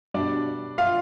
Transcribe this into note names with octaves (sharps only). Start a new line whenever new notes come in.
B2 G3 D4 D5
F4 F5